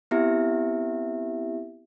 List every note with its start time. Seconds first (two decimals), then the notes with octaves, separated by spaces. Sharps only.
0.11 B3 C4 E4 G4 E5